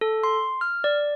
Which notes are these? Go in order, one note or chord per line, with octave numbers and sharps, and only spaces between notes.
A4
C6
F6
D5